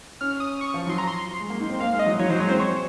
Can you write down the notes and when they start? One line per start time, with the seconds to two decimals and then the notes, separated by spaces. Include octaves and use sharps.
0.21 C#4 F6
0.40 D#6
0.61 C#6
0.74 F3
0.81 C#6
0.87 F#3 C6
0.98 A#5
1.08 C6
1.40 G#3
1.50 A#3
1.60 D#4
1.70 C4
1.79 A#3 F5
1.93 G#3
1.99 D#5
2.06 F#3
2.19 F#3 C#5
2.30 F#3 C5
2.39 G#3 C#5
2.49 C4 C5
2.60 C#5